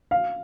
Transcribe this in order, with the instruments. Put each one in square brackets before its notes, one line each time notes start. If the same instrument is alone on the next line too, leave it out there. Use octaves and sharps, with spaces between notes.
[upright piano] F5